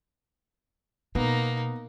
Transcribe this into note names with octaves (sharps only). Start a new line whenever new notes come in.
B2 A#3 B3 D#4